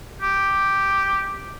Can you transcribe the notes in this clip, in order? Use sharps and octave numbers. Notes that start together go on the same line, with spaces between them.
G4